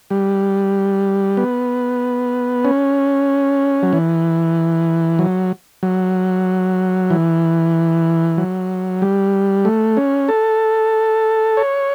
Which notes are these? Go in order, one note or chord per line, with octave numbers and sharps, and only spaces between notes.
G3
B3
C#4
F#3
E3
F#3
F#3
E3
F#3
G3
A3
C#4
A4
C#5